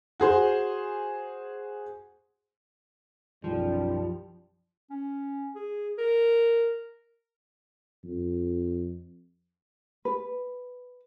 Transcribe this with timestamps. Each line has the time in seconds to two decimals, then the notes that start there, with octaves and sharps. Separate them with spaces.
0.20 F#4 G#4 C5
3.44 B1 F#2 F3 G3
4.90 C#4
5.55 G#4
5.98 A#4
8.04 F2
10.05 B4